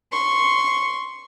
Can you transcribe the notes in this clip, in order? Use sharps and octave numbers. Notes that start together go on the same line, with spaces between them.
C6 C#6